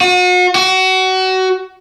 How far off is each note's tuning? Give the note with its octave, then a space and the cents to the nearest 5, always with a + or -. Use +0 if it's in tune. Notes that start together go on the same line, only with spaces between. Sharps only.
F#4 -40
F#4 +25